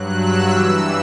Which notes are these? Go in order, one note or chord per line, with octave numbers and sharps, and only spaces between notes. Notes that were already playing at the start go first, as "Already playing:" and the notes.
Already playing: G2 F#3 F#6
E6
G2 E3 E6